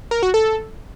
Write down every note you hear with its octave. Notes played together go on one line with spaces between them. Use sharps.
A#4
F#4
A4